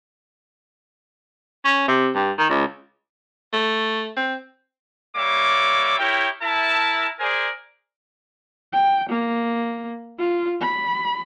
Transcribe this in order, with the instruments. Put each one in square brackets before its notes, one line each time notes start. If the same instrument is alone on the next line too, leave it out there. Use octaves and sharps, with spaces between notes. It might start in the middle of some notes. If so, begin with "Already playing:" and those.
[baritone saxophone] C#4
C3
G2
D#3
C#2
A3
C4
[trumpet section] G3 A#3 C#5 E5 D6
E4 G4 A#4 C#5 G5
E4 A#4 E5 A5
G#4 A#4 C5 D5 G#5
[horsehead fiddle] G5
A#3
F4
B5